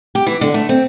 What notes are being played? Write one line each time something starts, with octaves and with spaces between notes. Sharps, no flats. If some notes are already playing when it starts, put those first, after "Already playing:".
G4
E3
D3
A3
C4